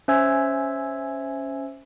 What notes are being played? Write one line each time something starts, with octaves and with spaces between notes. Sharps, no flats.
C#4 C5 E5 G#5 E6 G#6